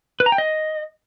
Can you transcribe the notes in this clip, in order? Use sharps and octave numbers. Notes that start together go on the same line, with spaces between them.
B4
A#5
G5
D#5